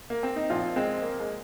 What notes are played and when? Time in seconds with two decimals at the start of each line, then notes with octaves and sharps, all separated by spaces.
0.10 A#3
0.23 C4
0.36 D#4
0.50 A#2 F3 C4 F4
0.76 G#3 C4
1.02 A#3
1.20 G#3